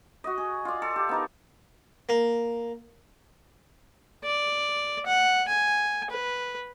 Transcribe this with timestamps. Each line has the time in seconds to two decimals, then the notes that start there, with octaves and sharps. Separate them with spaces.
0.24 F#4 D#5
0.38 G#4
0.65 F4 D5
0.82 A4
0.96 G4
1.09 B3 D#4 A#4
2.09 A#3
4.24 D5
5.06 F#5
5.48 G#5
6.10 B4